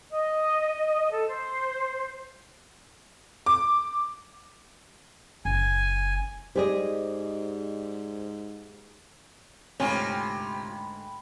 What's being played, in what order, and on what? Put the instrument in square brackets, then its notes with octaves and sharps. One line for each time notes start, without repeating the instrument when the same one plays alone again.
[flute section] D#5
A4
C5
[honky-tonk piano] D6
[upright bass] F#1 [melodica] G#5
[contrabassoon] G#2 [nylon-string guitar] G4 G#4 D#5 [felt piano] C5 D5
[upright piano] D2 G#2 [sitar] C3 F4 [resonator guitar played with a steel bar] C#4 [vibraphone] G5 B5